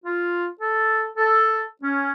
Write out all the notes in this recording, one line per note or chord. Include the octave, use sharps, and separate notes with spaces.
F4
A4
A4
C#4